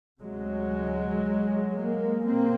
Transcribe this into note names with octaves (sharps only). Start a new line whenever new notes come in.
D2 C3 F#3 G#3
G#3 A#3
B2 A#3 C4